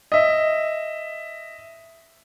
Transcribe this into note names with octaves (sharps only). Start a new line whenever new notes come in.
D#5 E5